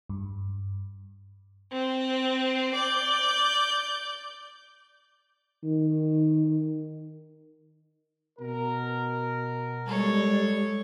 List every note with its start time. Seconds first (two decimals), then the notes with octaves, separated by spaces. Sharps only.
0.09 G2
1.73 C4
2.74 D5 G6
5.64 D#3
8.39 B2 A#4
9.86 G3 G#3 A4 C#5